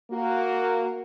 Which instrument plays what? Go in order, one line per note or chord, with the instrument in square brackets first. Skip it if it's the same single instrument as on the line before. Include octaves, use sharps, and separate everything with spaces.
[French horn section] A#3 F#4